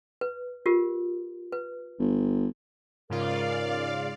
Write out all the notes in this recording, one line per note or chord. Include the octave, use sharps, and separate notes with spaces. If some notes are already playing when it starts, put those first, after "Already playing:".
B4
F4 G4 A#4
B4
G1
G#2 C#3 F4 A#4 D5 F5